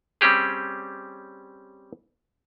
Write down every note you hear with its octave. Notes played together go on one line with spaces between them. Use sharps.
G3 C4 C#4 G4 G#4